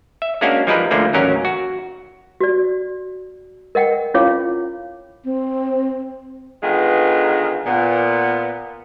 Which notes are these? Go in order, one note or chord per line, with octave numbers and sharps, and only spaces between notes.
E5
G#3 A#3 C#4 D4 F#4 F5
F3 G3 G#3 D#4 A#4 B4
D2 D3 F3 A3 A#3
A1 D#2 F#3 C#4 A#4
F#4
F#4 D5
A#4 D#5 F#5 G5
C#4 E4 F4 C#5 F5 D6
C4
D3 D#3 G#3 B3 F4 B4
A#2 B3